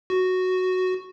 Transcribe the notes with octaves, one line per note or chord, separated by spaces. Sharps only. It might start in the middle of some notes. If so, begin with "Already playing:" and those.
F#4